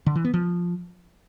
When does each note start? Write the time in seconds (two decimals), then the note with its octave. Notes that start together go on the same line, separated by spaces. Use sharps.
0.06 D3
0.15 E3
0.25 B3
0.34 F3